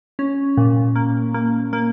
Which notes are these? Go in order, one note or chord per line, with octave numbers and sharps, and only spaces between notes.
C#4
A#2
A#3
A#3
A#3